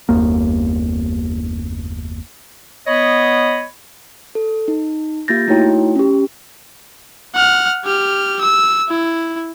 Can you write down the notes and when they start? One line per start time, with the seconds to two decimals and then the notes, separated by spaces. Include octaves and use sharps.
0.09 F#1 D#2 A#3
2.87 B3 C#5 D#5 B5
4.35 A4
4.68 D#4
5.28 A#3 F4 G4 G6 A6 A#6
5.48 A3 D#4 E4 F#4 C#5 G5
5.96 C#4 G4
7.35 F#5 F6
7.85 G4 F6
8.41 E6
8.89 E4